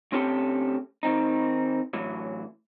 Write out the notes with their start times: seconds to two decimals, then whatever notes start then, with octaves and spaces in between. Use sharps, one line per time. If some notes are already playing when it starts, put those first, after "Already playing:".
0.12 D2 C4 C#4 G4 A4 G5
1.03 D#3 C4 D#4
1.93 A2 E3 F#3